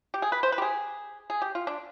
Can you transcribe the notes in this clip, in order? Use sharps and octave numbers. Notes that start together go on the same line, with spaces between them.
G4
G#4
B4
C5
B4
G4
G#4
G#4
G4
F4
D4